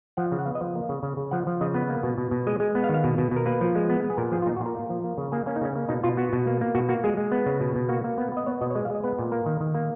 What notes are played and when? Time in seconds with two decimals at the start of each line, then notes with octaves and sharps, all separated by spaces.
0.17 F3 F#5
0.32 C#3
0.39 F#5
0.46 B3 F5
0.55 D#5
0.61 F3
0.75 A#3
0.89 C#3
1.03 C#3
1.17 C#3
1.31 F3 F#5
1.47 F3
1.61 C#3 D#5
1.74 B3 B4
1.90 A#3
2.03 B2
2.18 B2
2.31 B2
2.47 G#3 D#5
2.60 G#3
2.75 B3
2.84 F5
2.89 D#3
2.94 F5
3.04 B2
3.18 B2
3.31 B2
3.36 A#4
3.46 A#3 B4
3.61 F3
3.75 G#3
3.90 B3
4.04 B3
4.10 G#4
4.17 A#2 A#4
4.32 F3 G#4
4.42 F4
4.46 A#2 D#4
4.56 F#4
4.60 A#2
4.66 A#4
4.75 A#3
4.90 F3
5.04 A#3
5.18 C#3
5.32 A#3 G#4
5.46 A#3 C#4
5.56 D#4
5.61 C#3 C#4
5.75 A#3
5.89 B2 D#4
6.03 B2 F4
6.17 B3 F#4
6.33 B2
6.47 A#3
6.61 A#3
6.75 B2 F#4
6.89 A#3 F#4
7.04 G#3 G#4
7.17 G#3
7.32 B3
7.46 C#3
7.61 B2
7.76 B2
7.89 A#3 F#4
8.04 A#3
8.18 B3
8.32 B3 D#5
8.46 B3 C#5
8.61 B2 D#5
8.70 C#5
8.75 G#3 D#5
8.85 F5
8.90 G#3 D#5
9.03 B3 B4
9.19 A#2
9.32 A#3 A#4
9.46 D#3
9.61 D#3
9.75 A#3